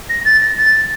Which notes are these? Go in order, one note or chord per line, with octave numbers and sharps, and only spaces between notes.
A#6
A6
A#6
A6